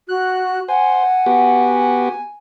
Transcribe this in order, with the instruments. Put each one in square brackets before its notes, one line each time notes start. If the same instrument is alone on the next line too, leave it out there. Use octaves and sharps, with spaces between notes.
[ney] F#4 [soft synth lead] F#6
[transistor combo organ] C5 [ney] F#5 [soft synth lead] G#5
[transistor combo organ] B3 F#4 G4